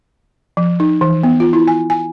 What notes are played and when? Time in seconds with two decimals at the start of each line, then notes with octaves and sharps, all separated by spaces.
0.57 F3
0.80 D#4
1.01 E3
1.23 B3
1.40 F4
1.53 E4
1.68 G#5
1.90 G#5